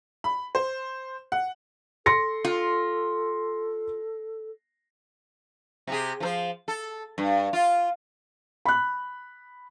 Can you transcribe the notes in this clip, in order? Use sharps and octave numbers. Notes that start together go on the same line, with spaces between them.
B5
C5
F#5
A4 C6 A#6 C#7
F4
C3 G4 G#4
F3 A4 C5
A4
G2
F4
B5 F#6